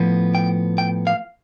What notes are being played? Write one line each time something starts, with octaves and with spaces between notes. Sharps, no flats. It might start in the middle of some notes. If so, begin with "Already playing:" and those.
Already playing: A2 F3 B3
G5
G5
F5